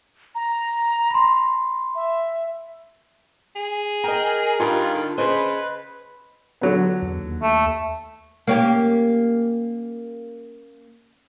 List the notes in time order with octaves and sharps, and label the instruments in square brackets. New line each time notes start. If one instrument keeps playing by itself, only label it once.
[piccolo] A#5
[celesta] B5 C6
[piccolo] E5
[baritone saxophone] G#4
[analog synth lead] A#4 [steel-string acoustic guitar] D#5 G5
[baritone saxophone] G2 [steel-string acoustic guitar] D#4 G4 A#4 [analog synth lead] F4
[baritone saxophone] D3
[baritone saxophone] C#3 [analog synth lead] B4 [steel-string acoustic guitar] C5 D#5 G#5
[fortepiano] D3 F#3 B3
[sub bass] E2
D#2
[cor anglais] A3
[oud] A#3 C#4 G4